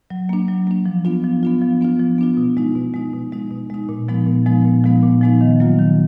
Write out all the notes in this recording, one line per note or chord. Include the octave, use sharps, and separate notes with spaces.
F#3
A#3 D4
F#3
A#3 D4
F3
B3 D4 F4
F3
B3 D4 F4
F3
B3 D4 F4
F3
B3 D4 F4
B2
G#3 D#4
B2
G#3 D#4
B2
G#3 D#4
B2
G#3 D#4
A#2
F3 G#3 B3 D#4
A#2
F3 G#3 B3 D#4
A#2
F3 G#3 B3 D#4
A#2
F3 G#3 B3 D#4
D#3
F#3 A#3 F4
D#3